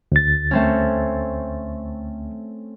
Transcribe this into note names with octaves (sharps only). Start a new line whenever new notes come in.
D2 A6
A3 C4 C#4